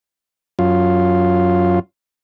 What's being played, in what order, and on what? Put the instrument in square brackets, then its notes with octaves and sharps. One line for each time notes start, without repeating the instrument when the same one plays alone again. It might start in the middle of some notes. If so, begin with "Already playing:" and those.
[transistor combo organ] F#2 F4